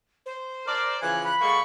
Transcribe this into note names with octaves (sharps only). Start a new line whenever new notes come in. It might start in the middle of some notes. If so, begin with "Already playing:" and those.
C5
A#4 D5
C#3 E3 F3 G#5 F#6
B5 F#6
D3 G#3 A#3 C#6